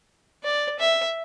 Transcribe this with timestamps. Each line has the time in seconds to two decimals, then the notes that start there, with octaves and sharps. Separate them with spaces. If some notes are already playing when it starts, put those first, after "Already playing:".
0.44 D5
0.79 E5